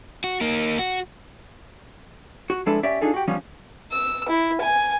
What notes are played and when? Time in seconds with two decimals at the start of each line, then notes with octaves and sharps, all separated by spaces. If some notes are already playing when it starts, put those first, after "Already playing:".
0.24 F#4
0.41 A#3 D#4
0.79 F#4
2.50 F#4
2.66 F3 G#3 D4 E4 A4 B4
2.83 C#4 G4 D5 E5
3.01 D4 D#4 F4 G#4 A4
3.14 F#4 G4
3.28 F3 G3 B3 C#4
3.92 E6
4.29 E4
4.61 G#5